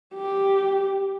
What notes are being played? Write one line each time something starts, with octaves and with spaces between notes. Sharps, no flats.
G4